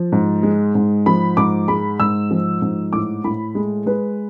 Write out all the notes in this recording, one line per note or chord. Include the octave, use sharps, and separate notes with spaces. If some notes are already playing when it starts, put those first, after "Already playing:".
Already playing: F3
G#2
G#3
G#2
F3 B5
G#2 D6
G#3 B5
G#2 E6
F3
G#2
A2 D6
A2 B5
G#3
G#3 B4